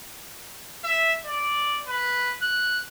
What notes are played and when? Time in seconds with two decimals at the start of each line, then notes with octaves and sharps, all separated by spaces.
0.84 E5
1.25 D5
1.87 B4
2.42 F#6